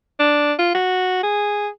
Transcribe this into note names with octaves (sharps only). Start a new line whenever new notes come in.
D4
F4
F#4
G#4